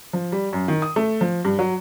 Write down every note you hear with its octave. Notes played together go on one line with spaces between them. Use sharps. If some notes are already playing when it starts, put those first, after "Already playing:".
F3
G3
F#2
D#3
D#6
A3
F3
G2
F#3